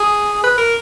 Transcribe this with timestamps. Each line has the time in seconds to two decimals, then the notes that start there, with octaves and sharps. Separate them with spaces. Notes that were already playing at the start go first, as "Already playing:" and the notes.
Already playing: G#4
0.44 B4
0.58 A#4